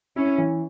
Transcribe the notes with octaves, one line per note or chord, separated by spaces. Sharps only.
C#4 E4
E3